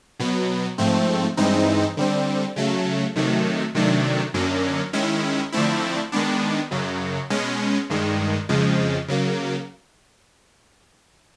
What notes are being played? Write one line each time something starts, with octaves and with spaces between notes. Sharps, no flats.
B2 F#3 B3
G#2 F3 A3 C4
G2 E3 G#3 C4 D#4
D3 G3 C4
C#3 F#3 A3
C3 D#3 F#3 A3
C3 D#3 F#3 A3 D4
F#2 D3 F#3 A#3 C#4
D#3 G#3 C#4 E4
D3 F3 A3 C4 E4
D#3 G#3 B3 D4
F#2 C#3 F#3
B2 G#3 C#4
G2 D#3 G#3
F2 C#3 F3 G#3
C#3 F#3 A#3